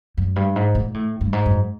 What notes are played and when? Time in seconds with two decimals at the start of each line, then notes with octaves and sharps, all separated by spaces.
0.17 F#2
0.36 G2
0.56 G#2
0.75 A#2
0.94 A2
1.21 G2
1.33 G#2
1.46 F#2